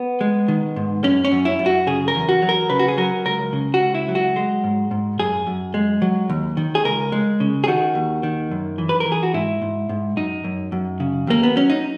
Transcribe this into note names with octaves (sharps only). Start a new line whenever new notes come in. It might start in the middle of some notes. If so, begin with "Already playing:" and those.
Already playing: B3
G#3
D#3
G#2
F#2 C#4
C#4
F#2
E4
F#2
F#4
C#3 G#4
A#4
E2
F#4
F#3
A#4
C#3 B4
F#4
G#4
F#3 A#4
C#2 A#4
C#3
F#4
C#2
E4
F#3
F#4
G#3
G#2
G#2
F#2 G#4
F#2
G#3
F#3
D#2
D#3
G#4
C#2 A#4
G#3
C#3
G#4
D#3 F#4
D#2
D#3
F#2
E3
B4
A#4
E3
G#4
F#4
G#2 E4
G#2
G#2
F#2 D#4
F#2
F#2
C#3
D#2 A#3
B3
F#3 C#4
D#4